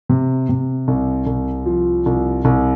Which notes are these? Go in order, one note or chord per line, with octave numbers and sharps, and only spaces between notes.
C3
C3
C2
C2
F3
C2
C2